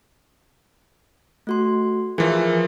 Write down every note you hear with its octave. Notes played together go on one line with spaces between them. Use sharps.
A3 F#4 C6
E3 F3 G#4 A#4 E5